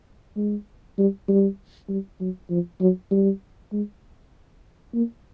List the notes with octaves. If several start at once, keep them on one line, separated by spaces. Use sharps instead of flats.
G#3
G3
G3
G3
F#3
F3
F#3
G3
G#3
A#3